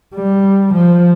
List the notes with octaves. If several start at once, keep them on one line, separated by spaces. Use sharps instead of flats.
G3
F3